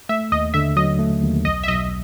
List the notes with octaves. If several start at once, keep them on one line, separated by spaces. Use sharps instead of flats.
A3 E5
D#2 D#5
D3 E5
F#3 D#5
A3
D#2
B1 D#5
E5
B1 D#5